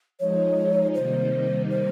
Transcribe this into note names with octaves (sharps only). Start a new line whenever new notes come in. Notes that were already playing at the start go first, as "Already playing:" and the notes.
F3 G#3 D#4 C#5
C3 D#3 G3 A#3 D#4 C5
C5